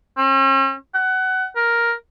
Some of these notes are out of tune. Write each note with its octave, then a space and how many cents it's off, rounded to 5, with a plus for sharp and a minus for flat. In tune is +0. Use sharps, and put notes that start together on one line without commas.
C#4 -45
F#5 +20
A#4 +5